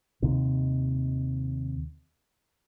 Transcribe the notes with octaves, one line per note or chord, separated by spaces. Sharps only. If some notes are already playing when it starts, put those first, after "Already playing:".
D#2 C3 D#3